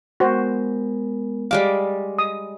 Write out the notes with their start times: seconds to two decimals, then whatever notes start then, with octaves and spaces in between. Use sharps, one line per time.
0.20 G#3 B3 F#4 A#4 C5
1.51 G3 G#3 F5 D6
2.19 D#5 D#6